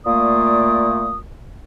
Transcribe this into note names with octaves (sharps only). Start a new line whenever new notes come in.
A#2 A3 A#3 D5 D#6